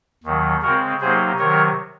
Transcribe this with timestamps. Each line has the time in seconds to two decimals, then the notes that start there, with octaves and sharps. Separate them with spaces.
0.24 D#2 D#3 F#3
0.62 C#3 G#3 C4 F#4 A#4
1.01 C3 F#3 A#3 D#4 G#4 C5
1.39 C3 D#3 F#3 A#4 C#5